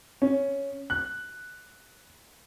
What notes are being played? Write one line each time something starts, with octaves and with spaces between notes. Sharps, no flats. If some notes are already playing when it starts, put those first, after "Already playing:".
C#4
F#6